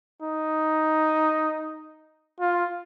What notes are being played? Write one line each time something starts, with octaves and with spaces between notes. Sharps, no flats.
D#4
F4